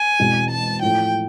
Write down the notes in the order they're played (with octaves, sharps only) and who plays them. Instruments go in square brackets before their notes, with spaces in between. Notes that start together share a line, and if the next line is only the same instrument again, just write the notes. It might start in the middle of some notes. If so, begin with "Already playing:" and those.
Already playing: [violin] G#5
[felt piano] E1 E2 B2 G#3 C4
[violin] A5
[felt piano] A2 F3 A3 [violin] G5